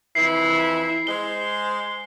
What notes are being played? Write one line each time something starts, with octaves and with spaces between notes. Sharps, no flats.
F2 E3 E4 C7
G#3 C5 G7